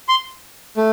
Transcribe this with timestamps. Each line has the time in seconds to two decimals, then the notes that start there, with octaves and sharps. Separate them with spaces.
0.09 C6
0.77 A3